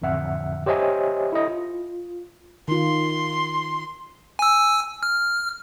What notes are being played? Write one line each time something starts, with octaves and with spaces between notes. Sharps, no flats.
A1 F2 D3 E5 F#5
G4 C5 C#5 D#5 E5 G#5
E4 A4 D#5
F4
D#3 F4 C6
G#5 E6
F6